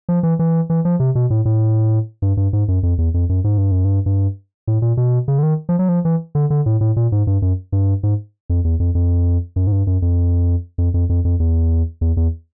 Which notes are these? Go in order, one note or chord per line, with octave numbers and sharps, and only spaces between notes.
F3
E3
E3
E3
F3
C3
B2
A2
A2
G2
G2
G#2
F#2
F2
E2
F2
F#2
G#2
G2
F#2
G2
G2
A2
A#2
B2
C#3
D3
D#3
F3
F#3
F3
E3
D3
D3
A2
A2
A#2
G#2
G2
F#2
G2
G#2
F2
E2
F2
F2
F#2
G#2
G2
F#2
F2
F2
F2
F2
F2
E2
E2
E2